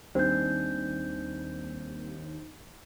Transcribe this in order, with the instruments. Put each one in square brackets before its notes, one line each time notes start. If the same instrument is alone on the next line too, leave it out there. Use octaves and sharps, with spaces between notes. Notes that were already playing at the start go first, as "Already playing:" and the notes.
[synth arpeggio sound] D#2 [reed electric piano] G3 C4 [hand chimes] D4 D#4 [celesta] C5 G6